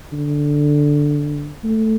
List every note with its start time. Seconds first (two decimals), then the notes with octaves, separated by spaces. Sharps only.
0.13 D3
1.64 A3